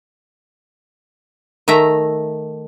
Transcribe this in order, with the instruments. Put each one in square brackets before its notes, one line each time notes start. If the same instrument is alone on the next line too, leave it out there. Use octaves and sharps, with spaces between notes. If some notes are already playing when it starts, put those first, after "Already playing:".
[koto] D#3 A3 E5 A#5